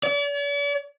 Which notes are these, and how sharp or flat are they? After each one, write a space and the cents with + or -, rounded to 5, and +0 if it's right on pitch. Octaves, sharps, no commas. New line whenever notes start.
D5 -45